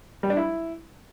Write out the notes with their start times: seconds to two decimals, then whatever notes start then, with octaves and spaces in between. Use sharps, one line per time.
0.23 G3
0.30 D4
0.37 E4